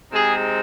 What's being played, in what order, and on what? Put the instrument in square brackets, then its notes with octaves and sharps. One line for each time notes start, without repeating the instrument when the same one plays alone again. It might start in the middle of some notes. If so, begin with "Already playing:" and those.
[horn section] C3 G#3 C4 D#4 G#4